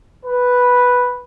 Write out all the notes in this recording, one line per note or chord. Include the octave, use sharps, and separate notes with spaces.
B4